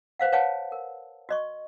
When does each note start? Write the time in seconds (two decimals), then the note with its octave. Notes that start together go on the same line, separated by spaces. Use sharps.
0.19 B4 C5 F5 F#5
0.32 B4 C#5 F5 F#5 G#5 A5
0.72 A#4
1.29 F#4 D#5 C#6